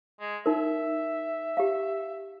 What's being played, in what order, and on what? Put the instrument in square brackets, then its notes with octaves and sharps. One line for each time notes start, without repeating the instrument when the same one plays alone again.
[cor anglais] G#3
[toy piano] D#4 A#4 [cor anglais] E5
[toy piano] G4 F5